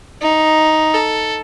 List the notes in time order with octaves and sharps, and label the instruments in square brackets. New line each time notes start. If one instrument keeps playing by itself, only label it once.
[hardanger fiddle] D#4
A4